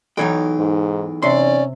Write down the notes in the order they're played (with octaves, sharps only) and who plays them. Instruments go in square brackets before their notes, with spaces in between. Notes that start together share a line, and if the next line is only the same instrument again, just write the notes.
[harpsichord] B1 E2 [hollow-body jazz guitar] D#4 C#5 G5
[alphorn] G#2
[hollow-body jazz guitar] C3 C6 [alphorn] C#4 [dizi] D5